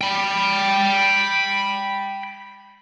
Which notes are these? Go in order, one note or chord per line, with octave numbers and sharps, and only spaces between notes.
G5 B5